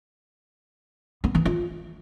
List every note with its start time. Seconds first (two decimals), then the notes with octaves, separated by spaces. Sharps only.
1.24 B3
1.35 E3
1.46 F4